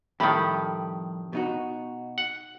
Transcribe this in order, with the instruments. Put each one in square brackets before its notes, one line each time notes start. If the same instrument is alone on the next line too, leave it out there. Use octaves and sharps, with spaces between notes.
[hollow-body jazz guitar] F2 G3 A4 [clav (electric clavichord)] A2 D#3 [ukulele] G4 B5
[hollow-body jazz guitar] B2 D#4 F#4
[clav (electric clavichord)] F#5